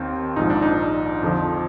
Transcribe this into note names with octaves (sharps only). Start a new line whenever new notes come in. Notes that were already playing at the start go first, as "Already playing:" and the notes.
Already playing: D#2 D#3 C4
A#1 G#2 F3 D#4
D4
D#4
F2 D3 F3